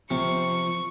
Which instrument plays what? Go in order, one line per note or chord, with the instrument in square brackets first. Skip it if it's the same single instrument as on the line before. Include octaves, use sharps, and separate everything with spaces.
[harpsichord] C3 [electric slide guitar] F3 [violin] C#6 C#7